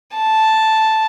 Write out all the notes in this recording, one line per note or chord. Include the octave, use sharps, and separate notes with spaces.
A5